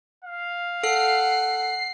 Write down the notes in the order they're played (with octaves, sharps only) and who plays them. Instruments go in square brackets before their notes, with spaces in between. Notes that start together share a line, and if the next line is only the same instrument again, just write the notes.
[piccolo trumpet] F5
[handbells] A4 [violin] F#5 [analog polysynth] C7